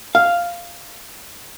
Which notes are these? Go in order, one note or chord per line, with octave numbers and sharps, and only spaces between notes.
F5